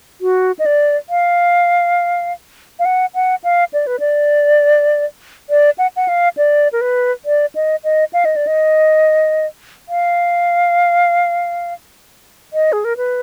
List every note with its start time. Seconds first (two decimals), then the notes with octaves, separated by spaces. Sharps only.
0.21 F#4
0.59 D#5
0.66 D5
1.09 F5
2.79 F5
2.85 F#5
3.15 F#5
3.44 F5
3.73 D5
3.87 B4
4.00 D5
5.50 D5
5.78 F#5
5.96 F#5
6.08 F5
6.37 D5
6.73 A#4
6.81 B4
7.25 D5
7.55 D#5
7.84 D#5
8.13 F5
8.25 D#5
8.36 D5
8.47 D#5
9.89 F5
12.53 D#5
12.73 G#4
12.85 A#4
12.97 B4